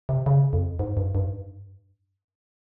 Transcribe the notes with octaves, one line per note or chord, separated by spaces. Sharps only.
C3
C#3
F2
G#2
G2
G2
G#2
G2